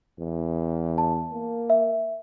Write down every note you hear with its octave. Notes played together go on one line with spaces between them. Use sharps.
E2
A5
A#3
E5